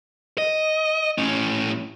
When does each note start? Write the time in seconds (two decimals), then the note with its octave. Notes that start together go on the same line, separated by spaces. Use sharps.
0.38 D#5
1.18 A2 C#4